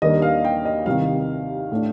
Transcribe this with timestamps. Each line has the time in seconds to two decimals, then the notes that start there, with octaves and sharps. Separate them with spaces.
0.02 D#2 D#3 G3 A#3 D4 D#5
0.22 F5
0.45 G5
0.65 D#5
0.86 C2 C3 D#3 F5
1.71 A2 A3 D4